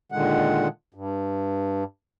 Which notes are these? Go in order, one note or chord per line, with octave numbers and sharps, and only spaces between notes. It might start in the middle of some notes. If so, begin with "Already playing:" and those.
A#2 D3 D#3 G#3 F#5
G2